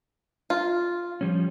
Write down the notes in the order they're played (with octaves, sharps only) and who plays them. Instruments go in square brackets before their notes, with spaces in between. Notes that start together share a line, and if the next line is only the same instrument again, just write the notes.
[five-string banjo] F4
[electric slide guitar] F3 G3 C#4